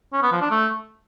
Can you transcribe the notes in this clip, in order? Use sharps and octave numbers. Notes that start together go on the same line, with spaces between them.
C#4
B3
F3
D4
A3